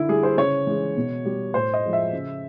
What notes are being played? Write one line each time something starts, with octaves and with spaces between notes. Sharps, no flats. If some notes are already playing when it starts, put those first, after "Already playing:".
Already playing: D3 E4
G3 G#4
C5
C#3 C#5
E3 G#3
B2
G3
A2 C5
D#5
F3 G#3
E5
C#3